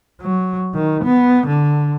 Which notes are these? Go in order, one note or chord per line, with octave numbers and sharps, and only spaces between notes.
F#3
D#3
B3
D3